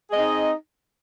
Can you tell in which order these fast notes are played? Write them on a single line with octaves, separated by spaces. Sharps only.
G#4 D#5 C4 D#4